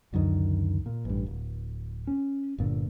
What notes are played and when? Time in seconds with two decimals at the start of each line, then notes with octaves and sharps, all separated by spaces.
0.13 C#2 F#2 D3 D#3
0.86 A#2
1.05 A1 G2
1.26 D1
2.07 C#4
2.58 G1 A#2 D3